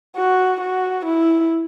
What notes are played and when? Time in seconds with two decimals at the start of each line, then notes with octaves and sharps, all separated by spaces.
0.16 F#4
0.61 F#4
1.06 E4